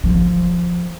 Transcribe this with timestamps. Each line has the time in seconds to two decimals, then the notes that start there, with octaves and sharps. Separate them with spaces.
0.04 F3